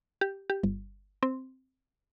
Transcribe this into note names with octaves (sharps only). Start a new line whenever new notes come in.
G4
G4
G1
C4